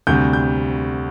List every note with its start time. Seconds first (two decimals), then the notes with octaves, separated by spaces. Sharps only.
0.07 D2 C3 G3 G6
0.33 G6